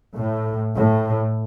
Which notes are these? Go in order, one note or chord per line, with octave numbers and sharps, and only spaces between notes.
A2
A2